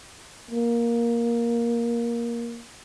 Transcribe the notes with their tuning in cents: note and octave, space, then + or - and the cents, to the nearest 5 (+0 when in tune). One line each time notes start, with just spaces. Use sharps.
A#3 +10